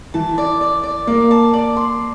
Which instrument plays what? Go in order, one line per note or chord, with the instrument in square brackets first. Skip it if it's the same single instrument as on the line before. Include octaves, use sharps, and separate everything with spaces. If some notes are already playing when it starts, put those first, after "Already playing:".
[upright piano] E3 [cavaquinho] A5
[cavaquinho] D5
D5
D5
[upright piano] A#3 [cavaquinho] D5
[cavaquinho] A5
D5
C6